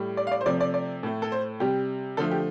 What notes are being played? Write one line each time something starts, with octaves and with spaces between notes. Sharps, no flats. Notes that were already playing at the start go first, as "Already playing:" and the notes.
Already playing: A2 G3
D5
F5
D5
C5
C3 F3 A3 D5
D5
D5
A2 A3
A4
C5
C3 G3 G4
D3 F3 A3 A4
G4